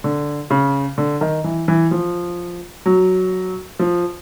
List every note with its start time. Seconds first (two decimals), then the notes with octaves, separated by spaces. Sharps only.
0.04 D3
0.50 C#3
0.98 D3
1.21 D#3
1.44 E3
1.68 E3
1.91 F3
2.86 F#3
3.79 F3